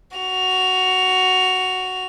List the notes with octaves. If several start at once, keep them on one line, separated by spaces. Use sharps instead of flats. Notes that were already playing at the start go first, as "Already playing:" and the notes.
F#4 F7